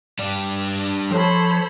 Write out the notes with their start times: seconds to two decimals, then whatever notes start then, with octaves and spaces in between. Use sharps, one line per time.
0.19 G3 D4
1.11 F3 A4 C5 C#5 B5